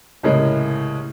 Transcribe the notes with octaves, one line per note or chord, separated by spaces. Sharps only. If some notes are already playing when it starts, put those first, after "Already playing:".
C2 A2 C#3 G#3 A#4